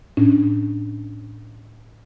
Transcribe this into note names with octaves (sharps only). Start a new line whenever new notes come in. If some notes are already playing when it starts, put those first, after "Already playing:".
A2 C#4 D4